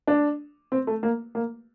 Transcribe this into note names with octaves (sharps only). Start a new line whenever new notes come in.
D4
C4
A3
A#3
A#3